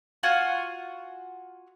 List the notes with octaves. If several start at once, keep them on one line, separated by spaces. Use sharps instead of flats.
F4 F#4 F#5 G#5